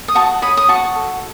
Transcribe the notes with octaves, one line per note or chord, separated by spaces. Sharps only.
D#6
F#4 A5 C#6
C#5 B5 D#6
D#6
F#4 A5 C#6
A4